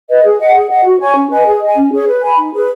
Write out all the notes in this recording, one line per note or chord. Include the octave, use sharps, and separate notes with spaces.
B4 D#5
G#4
D#5 F#5
G#4
D#5 F#5
F#4
C#5 G#5 C#6
C#4
B4 D#5 G#5
G#4
D#5
G#5
C#4
G#4 C#5
B4
G#5 B5
D#4
G#4 B4